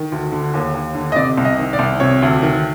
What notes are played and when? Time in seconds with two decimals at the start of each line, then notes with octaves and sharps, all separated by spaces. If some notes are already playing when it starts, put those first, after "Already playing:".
Already playing: D#3
0.12 D2
0.32 D3
0.54 D#2
0.74 D#2
0.95 D3
1.12 D#5
1.16 C3 D5
1.38 C2
1.45 D#5
1.59 D#3
1.73 D5
1.79 C2
2.00 C3 C#5
2.22 D2
2.42 D#3